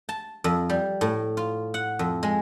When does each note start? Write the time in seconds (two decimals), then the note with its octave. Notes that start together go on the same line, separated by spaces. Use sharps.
0.09 A5
0.44 F2
0.69 G3
1.01 A2
1.37 F4
1.74 F#5
1.99 F2
2.23 G#3